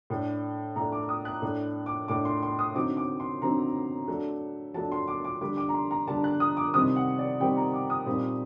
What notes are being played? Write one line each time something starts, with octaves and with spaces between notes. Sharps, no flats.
A2 A3 D4
A2 A3 D4 A#5
D6
D#6
F#6
A2 A3 D4
D6
A2 A3 D4 D6
C6
C6
D#6
D3 F#3 C4 D#4 D6
D6
C6
D3 F#3 C4 D#4 A#5
F#3 A3 D4
F#3 A3 D4 A5
C6
D6
D6
D3 G3 D4 D6
D6
A#5
C6
A#5
D3 G3 D4 A5
F#6
D#6
D6
C3 D#3 G3 C4 D#6
F#5
D5
C3 D#3 G3 C4 G5
A#5
D6
D#6
A#2 G3 C4 D#4